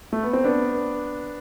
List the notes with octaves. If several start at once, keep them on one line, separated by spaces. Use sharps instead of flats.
A3
B3
C4
B3 D4